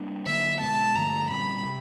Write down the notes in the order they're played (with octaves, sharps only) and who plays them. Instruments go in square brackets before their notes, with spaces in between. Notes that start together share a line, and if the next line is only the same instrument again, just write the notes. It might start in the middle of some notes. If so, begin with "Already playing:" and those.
Already playing: [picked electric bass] G3 A#3 D4
[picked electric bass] D3 F#3 A#3 [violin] E5
[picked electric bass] B2 G#3 B3 [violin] A5
[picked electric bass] G2 D3 F3 A3 [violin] A#5
[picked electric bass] A#2 G3 C4 [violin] B5
[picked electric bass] C3